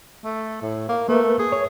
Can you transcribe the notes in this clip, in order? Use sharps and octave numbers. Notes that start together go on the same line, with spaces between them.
A3
A2
A#3
A3 A#3 A#4 B4
G#4
C#5